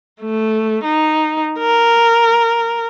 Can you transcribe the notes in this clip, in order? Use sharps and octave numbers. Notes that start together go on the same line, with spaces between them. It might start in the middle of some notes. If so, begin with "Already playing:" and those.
A3
D#4
A#4